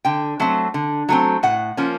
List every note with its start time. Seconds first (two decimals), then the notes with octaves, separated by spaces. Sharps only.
0.05 D3 G5
0.40 F#3 A3 C4
0.74 D3
1.09 F#3 A3 C4
1.43 A2 F#5
1.77 F3 A#3 C#4